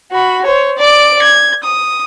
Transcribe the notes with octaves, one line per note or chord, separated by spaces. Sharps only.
F#4 B5
C5 C#5
D5 D7
G#6
D#6